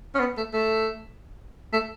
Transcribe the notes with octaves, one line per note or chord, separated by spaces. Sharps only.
C#4
B3
A3
A3
A3